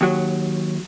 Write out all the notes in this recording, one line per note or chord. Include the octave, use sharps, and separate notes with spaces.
D#2 F#3